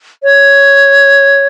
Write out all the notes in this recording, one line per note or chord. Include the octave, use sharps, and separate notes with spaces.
C#5